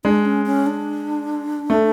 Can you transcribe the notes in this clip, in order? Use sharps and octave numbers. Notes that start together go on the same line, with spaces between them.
G#3 D4
C#4
C#4
D4
A3